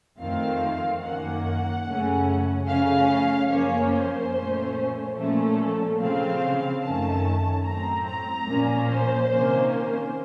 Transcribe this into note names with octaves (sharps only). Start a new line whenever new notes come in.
F2 D#3 A3 C4 F5
F#2 D#3 A#3 C#4 F#5
F#2 C#3 A3 C#4
C#3 F3 A3 C#4 F5
F#2 F3 A#3 C#4 C#5
C5
A#2 F3 A3 C#4
A#2 F3 A3 C#4 A4
C#3 F3 C4 F5
F#2 D#3 A3 C#4 A5
A2 F#3 C4 A#5
A#5
A#2 F3 A#3 C#4
C5
C3 D#3 A#3 C#4
C5